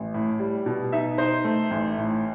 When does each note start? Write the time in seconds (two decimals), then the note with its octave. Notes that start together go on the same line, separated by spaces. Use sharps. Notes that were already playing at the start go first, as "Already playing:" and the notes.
Already playing: A1
0.14 A2
0.39 G3
0.66 B2
0.92 D#4 E5
1.18 D#4 C5
1.44 A3
1.71 A1
1.98 A2